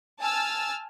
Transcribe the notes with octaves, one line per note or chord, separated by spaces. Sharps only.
G#5 A5 E6 F6 A6